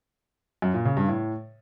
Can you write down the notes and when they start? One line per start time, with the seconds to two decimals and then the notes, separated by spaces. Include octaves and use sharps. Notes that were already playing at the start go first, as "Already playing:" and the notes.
0.62 F#2
0.74 A#2
0.85 C#3
0.97 G2
1.08 A2